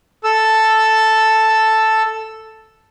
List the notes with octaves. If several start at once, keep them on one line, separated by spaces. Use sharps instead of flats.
A4 E6